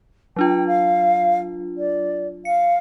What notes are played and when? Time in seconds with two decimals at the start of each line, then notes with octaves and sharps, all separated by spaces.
0.36 F#3 D4 F4 G5
0.67 F5
1.77 D5
2.45 F5 C#7